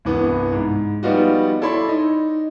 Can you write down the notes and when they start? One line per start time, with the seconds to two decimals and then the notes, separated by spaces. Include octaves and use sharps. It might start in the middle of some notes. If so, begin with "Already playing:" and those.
0.05 C2 G2 E3 B3
0.53 G#2
1.03 F3 G3 B3 D#4 F4 F#4
1.62 E4 A4 C#5 D5 B5 C6
1.88 D#4